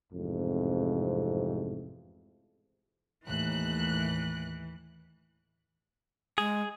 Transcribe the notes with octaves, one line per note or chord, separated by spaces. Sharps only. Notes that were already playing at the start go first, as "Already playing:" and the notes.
A1 F2 G#2 C3
D#2 A2 E3 F#6
G#3 G#4